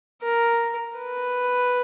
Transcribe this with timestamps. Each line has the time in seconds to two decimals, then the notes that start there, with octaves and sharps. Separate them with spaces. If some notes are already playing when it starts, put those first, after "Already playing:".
0.23 A#4
0.97 B4